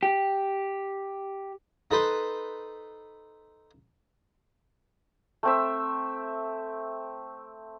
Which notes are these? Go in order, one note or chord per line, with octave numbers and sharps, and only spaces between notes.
G4
D#4 A4 B4 C5
A3 C4 E5